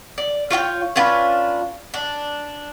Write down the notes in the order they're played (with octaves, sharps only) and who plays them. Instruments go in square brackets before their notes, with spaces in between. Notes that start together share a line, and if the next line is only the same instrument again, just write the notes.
[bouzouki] D5
F4 C#5 F5 G5
C#4 D4 F4 B4
D4